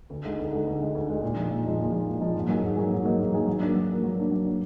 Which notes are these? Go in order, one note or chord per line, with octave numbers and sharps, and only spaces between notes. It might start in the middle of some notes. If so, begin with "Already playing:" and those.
D2
D3 G#3 D#4
D2
D3 G#3 D#4
D2
D3 G#3 D#4
D2
D3 G#3 D#4
A#2
F3 G#3 D#4
A#2
F3 G#3 D#4
A#2
F3 G#3 D#4
A#2
F3 G#3 D#4
G#2
F#3 A#3 D#4 G#4
G#2
F#3 A#3 D#4 G#4
G#2
F#3 A#3 D#4 G#4
G#2
F#3 A#3 D#4 G#4
F#3
A#3 D4
F#3
A#3 D4
F#3
A#3 D4
F#3
A#3 D4